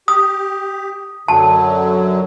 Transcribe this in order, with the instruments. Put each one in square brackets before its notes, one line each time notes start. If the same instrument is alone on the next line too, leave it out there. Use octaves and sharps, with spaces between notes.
[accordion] G4 [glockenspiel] D#6
[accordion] F#2 D3 F#3 [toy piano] A5